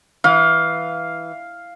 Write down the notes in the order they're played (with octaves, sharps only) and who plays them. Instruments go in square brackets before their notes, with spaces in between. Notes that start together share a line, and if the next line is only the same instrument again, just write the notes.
[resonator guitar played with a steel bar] E3 [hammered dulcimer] F5